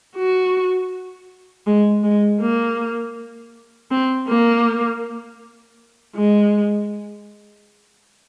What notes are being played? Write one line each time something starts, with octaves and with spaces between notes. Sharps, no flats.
F#4
G#3
G#3
A#3
C4
A#3
G#3